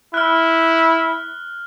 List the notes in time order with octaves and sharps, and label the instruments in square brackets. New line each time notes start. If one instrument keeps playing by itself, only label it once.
[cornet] E4 [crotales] F6 F#6